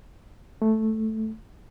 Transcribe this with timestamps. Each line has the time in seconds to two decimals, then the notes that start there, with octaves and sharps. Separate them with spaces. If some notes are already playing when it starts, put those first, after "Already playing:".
0.62 A3